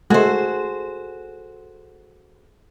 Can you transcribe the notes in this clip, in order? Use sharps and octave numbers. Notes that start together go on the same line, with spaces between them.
G#3 A3 F#4 G#4 A4 C5